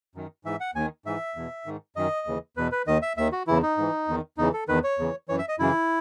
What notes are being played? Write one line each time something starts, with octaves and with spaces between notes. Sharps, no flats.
F#2 D#3
G#2 E3 E5
F#5
D#2 D#3 G#5
G#2 E3 E5
E2 B2
G#2 D#3
F#2 D#3 D#5
D#2 C#3 E3
E2 B2 B4
B4
D#2 D#3 D#5
E5
D#2 D#3 E5
F#4
E2 C#3 E3 E4
D#4
G#2 E3
E2 D#3
E2 C#3 E3 D#4
A4
E2 D#3 B4
C#5
E2 C#3 E3
F#2 E3 C#5
E5
D#5
F#2 C#3 E3 E4